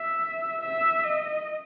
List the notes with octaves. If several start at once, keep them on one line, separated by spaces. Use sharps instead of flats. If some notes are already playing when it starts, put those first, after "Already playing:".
Already playing: E5
E5
D#5